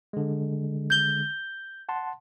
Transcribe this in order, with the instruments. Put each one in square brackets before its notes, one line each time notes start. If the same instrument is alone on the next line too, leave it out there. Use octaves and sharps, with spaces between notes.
[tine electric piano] D3 G#3
[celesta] G6 G7
[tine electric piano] F#5 A5 C6